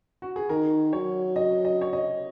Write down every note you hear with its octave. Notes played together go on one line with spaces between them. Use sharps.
F#4
G#4
D#3 A#4
F#3 C#5
D#5
D#5
C#5
D#5